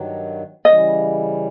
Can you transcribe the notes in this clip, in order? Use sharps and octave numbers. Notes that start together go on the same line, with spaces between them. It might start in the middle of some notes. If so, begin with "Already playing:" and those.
Already playing: G2 D#3 F#3
C#3 E3 G3 D#5